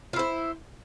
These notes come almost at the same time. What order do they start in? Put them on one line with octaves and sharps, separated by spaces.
F4 E4 C5